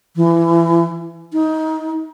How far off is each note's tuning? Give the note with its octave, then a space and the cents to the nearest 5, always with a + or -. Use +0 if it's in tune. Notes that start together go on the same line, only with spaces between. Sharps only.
E3 +25
D#4 +20